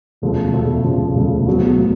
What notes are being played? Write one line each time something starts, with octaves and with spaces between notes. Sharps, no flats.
E1 D2 C#3 F3 A3
E1 D2 C#3 F3 A3
E1 D2 C#3 F3 A3
E1 D2 C#3 F3 A3
B1 A2 F#3 B3
A2 F#3